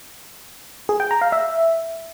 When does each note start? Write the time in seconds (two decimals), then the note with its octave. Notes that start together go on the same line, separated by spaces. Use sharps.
0.89 G#4
1.00 G5
1.11 A#5
1.22 F5
1.32 E5